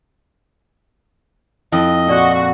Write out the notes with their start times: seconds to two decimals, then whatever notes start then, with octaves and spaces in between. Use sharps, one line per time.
1.72 F2 E4 D#5 G5
2.09 A#2 F#4 D5